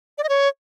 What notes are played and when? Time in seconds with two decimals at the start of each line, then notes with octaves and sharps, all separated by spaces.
0.18 D5
0.24 D#5
0.29 C#5